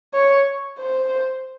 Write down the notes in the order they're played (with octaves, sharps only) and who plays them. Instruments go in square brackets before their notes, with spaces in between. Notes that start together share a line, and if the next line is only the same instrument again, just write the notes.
[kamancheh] C#5
C5